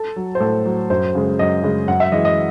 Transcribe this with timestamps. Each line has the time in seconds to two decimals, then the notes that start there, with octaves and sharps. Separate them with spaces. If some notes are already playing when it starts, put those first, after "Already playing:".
Already playing: A4
0.16 F#3
0.35 C5
0.40 A2 A4
0.66 F#3
0.90 F#2 C5
1.15 C#3 G#3
1.39 F#2 D#5
1.63 C#3 G#3
1.87 F#2 F#5
2.00 E5
2.12 E3 G#3 D#5
2.25 D#5